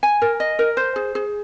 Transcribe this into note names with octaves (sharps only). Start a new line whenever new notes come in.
G#5
A#4
D#5
A#4
C5
G#4
G#4